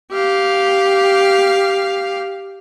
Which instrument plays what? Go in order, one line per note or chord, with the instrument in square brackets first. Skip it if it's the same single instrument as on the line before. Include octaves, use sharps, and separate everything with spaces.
[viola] G4 F5